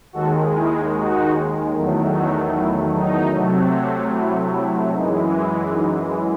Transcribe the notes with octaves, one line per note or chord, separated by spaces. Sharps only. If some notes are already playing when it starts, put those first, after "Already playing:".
D#2 D#3 G#3 F#4 A4
E4 G#4
D#4 F#4
E2 D#3 F#3 A3
D#4 F#4
E4
D#4
C3 F#3 A3
E4
E4
F#2 E3 G#3 D#4
E4
D#4